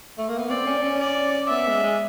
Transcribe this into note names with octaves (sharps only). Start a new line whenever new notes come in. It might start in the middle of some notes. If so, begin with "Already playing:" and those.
A3
A#3
B3
C4 D5
C#4
D4
C#4
D5
B3 E5
G#3
G#3